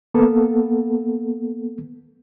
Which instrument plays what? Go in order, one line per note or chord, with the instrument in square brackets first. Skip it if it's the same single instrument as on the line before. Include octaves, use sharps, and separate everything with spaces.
[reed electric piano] A#3 B3 A4